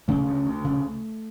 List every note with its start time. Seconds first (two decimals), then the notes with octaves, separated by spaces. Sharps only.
0.08 C#3 A3
0.26 D2
0.46 D2
0.64 C#3